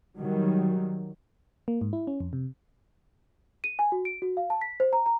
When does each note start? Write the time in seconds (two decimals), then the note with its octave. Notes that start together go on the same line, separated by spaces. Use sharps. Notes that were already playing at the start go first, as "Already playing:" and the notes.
0.19 D#3 F#3 G3
1.68 A#3
1.81 G#2
1.93 E4
2.07 C#4
2.20 F2
2.33 C3
3.64 D#7
3.79 G#5
3.92 F#4
4.05 D7
4.22 F#4
4.37 F5
4.50 A5
4.61 B6
4.80 C5
4.93 A#5
5.06 A#5